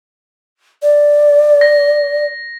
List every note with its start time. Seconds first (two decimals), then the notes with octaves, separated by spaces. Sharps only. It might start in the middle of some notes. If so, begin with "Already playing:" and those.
0.82 D5
1.61 A#6